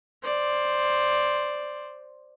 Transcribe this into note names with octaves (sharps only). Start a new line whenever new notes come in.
C5 D5